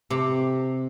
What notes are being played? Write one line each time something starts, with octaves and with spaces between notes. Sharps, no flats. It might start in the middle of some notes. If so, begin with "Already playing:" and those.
C3